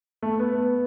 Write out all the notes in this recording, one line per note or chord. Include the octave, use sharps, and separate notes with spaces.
A3
B3